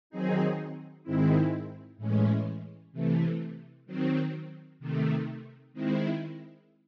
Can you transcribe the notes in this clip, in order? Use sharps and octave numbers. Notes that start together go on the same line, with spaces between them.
D#3 F#3 C4 D#4 G#4
G#2 D#3 G#3 C4 E4
A2 E3 G#3 C#4
C3 E3 A3
D#3 F#3 C4
C3 D#3 A3
D#3 G#3 C4 E4